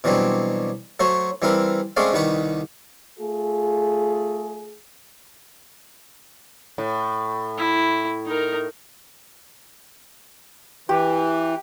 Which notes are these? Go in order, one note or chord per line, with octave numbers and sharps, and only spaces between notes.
B2 E3 F#3 G3 C4 D4
F#3 A3 F#4 C5 C#5
E3 G3 C4 E4 A#4 B4
G#3 A3 C4 C#4 D5 F5
C2 D#3 G3 B4 F#5 C#6
A3 F4 G#4
A2
E4
D#4 A#4
E3 G4